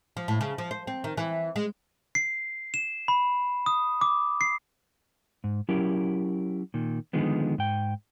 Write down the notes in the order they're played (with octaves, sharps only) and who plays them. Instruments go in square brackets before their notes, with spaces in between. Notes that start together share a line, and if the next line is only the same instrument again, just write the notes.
[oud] F3
A2
C#3
F3
C5
C4
D#3
E3
G#3
[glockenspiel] C7
E7
B5
D#6
D6
C7
[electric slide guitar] G#2
F#3 C#4 E4 G4 A#4
A#2 D#3
D3 D#3 F3 G#3 B3
G#2 G5